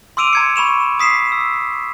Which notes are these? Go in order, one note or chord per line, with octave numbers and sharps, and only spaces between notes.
C6 D6 E6 D7 D#7 F7
A#5 G#6 C#7
B5 C#6 E7 F7
D#6 B6 C7 E7
E6